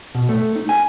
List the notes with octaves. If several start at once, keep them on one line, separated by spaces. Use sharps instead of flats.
B2
A3
D#4
G#5